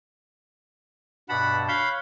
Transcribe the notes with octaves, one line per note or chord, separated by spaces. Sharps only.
G2 B2 F#5 A5 B5
C#5 F5 F#5 B5 G6